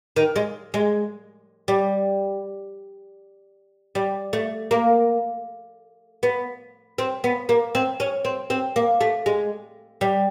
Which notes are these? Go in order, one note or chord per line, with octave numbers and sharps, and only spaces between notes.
D#3
G#3
G#3
G3
G3
A3
A#3
B3
C4
B3
A#3
C4
C#4
C4
C4
A#3
A3
G#3
G3